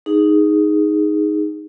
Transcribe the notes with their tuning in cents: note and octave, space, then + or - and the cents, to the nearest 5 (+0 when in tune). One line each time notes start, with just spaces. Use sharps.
D#4 +0 G#4 -5